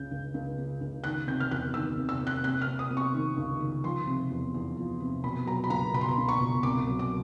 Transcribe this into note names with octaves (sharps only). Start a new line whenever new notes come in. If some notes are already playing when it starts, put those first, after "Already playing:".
Already playing: C#2 C#3 G6
C#2
C#2
C#3
C#2
D#3 F#6
C3 G6
F6
E2 F#6
D#3 E6
C3
E6
C3
F#6
C3 F#6
F6
C3
D#6
C3
C#6
D#3
C#2
D#3
F3 C6
C3
E2
E2
F3
C3
B2 B5
F#3 A#5
B5
C#2 A#5
B2 B5
C6
B5
C#2
C#6
B2
C2 D6
F#3
D6